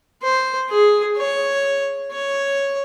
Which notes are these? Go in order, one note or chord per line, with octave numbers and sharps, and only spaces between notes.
C5
G#4
C#5
C#5